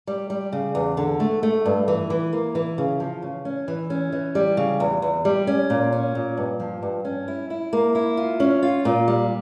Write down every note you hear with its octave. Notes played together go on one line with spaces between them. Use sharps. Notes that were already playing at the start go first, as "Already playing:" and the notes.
G3
G3
C#3
E2
D3
A3
A3
G2
E3
E3
A#3
E3
C#3
F3
C#3
C#4
E3
C#4
E3
G3
C#3
E2
E2
G3
C#4
A#2
C#4
A#2
G2
F3
G2
C#4
E4
E4
A#3
E4
F4
C#4
F4
A#2
G3